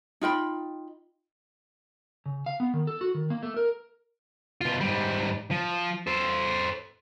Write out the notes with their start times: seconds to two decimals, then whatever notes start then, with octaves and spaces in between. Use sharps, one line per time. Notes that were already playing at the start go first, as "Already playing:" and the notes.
0.21 D#4 F4 G5 B5
2.26 C#3
2.46 F5
2.60 B3
2.74 D#3
2.87 A4
3.01 F#4
3.15 D#3
3.30 A#3
3.43 A3
3.57 A#4
4.61 B2 F4
4.81 G#2 G3
5.51 F3
6.07 A4 C5